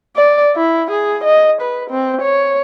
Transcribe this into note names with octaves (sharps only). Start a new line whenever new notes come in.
D5
E4
G#4
D#5
B4
C4
C#5